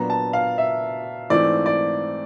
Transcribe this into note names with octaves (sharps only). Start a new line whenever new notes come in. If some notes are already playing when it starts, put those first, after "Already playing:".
Already playing: A#2 F#3 B3 D4 A#5
A5
F5
E5
G#2 E3 A3 C4 F4 D5
D5